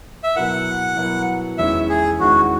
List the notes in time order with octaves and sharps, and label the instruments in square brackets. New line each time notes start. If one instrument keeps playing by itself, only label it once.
[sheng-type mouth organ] E5
[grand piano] B2 F#3 B3 E4 A#4 [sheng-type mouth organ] F#5
[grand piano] B2 F#3 B3 E4 A#4
[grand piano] E2 D#3 G#3 C#4 E4 [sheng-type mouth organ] E5
[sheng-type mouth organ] G#4
[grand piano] E2 D#3 G#3 C#4 E4 [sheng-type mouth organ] F#4